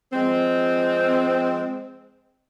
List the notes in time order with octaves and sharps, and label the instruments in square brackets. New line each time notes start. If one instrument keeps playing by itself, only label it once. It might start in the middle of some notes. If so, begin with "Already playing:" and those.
[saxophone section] F3 G#3 C4